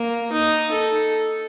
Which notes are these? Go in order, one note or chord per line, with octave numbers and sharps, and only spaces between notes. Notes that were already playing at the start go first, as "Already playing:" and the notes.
Already playing: A#3
D#4
A4